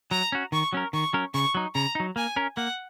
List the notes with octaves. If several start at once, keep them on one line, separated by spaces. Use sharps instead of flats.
F#3 A#5
C#4 F#4
D#3 C#6
F#3 C#4 A#4
D#3 C#6
F#3 C#4 A#4
C#3 C#6
F#3 D#4
C#3 A#5
F#3 D#4
A#3 G#5
C#4 A#4
A#3 F#5